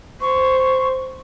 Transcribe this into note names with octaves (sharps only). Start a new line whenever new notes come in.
C5 C#6